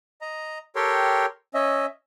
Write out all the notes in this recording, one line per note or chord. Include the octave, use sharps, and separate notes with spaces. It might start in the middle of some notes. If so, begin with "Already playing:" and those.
D#5 A#5
G4 A4 A#4 C#5 G5 C6
C#4 D#5 E5